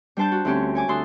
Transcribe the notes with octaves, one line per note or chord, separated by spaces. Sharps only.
G3 D4 C5 A5 G6
F#4
D2 C4 C#4 G4 C#5
C#5 G#5 D6
D2 F#4 A4 C6 D#6